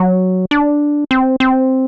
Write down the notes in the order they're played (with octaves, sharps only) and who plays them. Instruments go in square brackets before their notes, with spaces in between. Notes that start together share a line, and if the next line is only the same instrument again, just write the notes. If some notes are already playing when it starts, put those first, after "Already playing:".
Already playing: [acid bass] F#3
D4
C4
C4